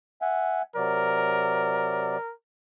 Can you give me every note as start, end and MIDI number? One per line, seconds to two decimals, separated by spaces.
0.22 0.62 76
0.22 0.62 78
0.22 0.62 80
0.76 2.17 48
0.76 2.17 54
0.76 2.33 70
0.76 2.17 74